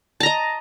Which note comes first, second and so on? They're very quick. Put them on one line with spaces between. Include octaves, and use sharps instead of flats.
A5 A#5 D#5